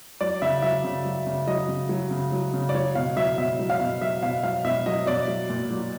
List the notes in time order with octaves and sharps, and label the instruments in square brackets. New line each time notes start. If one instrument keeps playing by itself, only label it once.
[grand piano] F#3 D5
C#3 E5
F#3 E5
C#3
F#3
C#3
F#3 D#5
C#3
F#3
C#3
F#3
C#3
D5
F#3 C#5
B2 F5
F#3 E5
B2 E5
F#3
F5
B2
F#3 E5
B2 F5
F#3 F5
B2 E5
F#3 D#5
B2 D5
F#3
A#2
F#3